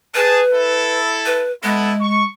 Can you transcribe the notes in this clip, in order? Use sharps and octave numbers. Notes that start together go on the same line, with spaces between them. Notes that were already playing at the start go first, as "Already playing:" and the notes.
G#4 B4 A5
E4 A4
B4
G#3 B3 E4 A4
C#6